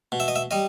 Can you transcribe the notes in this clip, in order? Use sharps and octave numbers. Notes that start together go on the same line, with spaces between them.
B2
E5
D#5
E5
G3 D#5